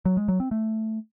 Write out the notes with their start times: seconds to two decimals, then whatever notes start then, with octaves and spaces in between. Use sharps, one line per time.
0.05 F#3
0.17 G#3
0.28 F#3
0.40 C4
0.51 A3